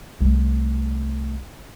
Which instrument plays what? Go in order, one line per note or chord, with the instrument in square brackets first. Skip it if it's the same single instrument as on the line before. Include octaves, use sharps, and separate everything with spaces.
[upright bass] C2 A3